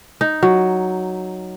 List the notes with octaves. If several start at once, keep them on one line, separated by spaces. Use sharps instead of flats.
D#4
F#3